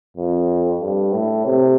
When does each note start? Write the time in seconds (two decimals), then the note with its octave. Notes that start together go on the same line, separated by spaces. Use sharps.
0.17 F2
0.81 G2
1.12 A2
1.45 C3